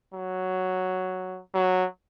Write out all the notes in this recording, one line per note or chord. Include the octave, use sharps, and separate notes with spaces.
F#3
F#3